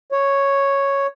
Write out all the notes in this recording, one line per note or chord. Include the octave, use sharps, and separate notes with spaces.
C#5